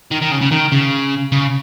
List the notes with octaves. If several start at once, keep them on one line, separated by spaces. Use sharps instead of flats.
D#3
D#3
C#3
C#3
D#3
C#3
C#3